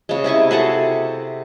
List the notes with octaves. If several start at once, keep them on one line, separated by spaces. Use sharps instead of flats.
C#3 G#3
C3 E4 D#5 C#6
F#4 G#4 A4 F#5